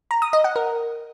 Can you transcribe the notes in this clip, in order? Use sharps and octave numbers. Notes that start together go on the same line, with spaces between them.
A#5
D#6
D#5
F#5
A#4